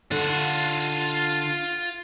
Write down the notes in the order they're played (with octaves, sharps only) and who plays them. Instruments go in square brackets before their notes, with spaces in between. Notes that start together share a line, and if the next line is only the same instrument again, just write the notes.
[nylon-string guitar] D3 [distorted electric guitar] F4 F#5